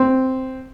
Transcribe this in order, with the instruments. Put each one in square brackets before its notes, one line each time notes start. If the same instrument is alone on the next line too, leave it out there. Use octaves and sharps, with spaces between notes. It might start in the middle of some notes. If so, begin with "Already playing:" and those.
Already playing: [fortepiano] C4